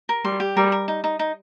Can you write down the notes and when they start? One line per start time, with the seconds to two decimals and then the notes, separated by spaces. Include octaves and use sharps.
0.09 A#4
0.24 G3 C6
0.40 G4
0.56 G3 A#4
0.72 A#4
0.88 D#4
1.04 D#4
1.19 D#4